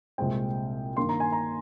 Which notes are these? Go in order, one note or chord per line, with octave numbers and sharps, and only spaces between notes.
C2 A#2 G#3 C4 G5
G2 D#3 A#3 C6
A#5
G#5
A#5